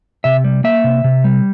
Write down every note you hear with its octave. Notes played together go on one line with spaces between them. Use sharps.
C3 E5
G3
A#3 E5
C3
C3
G3